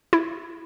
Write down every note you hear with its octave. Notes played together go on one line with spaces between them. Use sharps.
E4